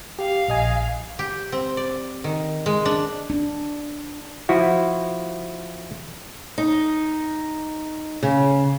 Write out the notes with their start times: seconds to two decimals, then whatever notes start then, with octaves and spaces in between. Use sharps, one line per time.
0.19 G4 F5
0.48 A#1 D#5 G#5
1.19 G4
1.52 C4
1.77 D5
2.24 D#3
2.66 G#3
2.86 D4
3.30 D4
4.49 F3 E4 F#4
6.58 D#4
8.23 C#3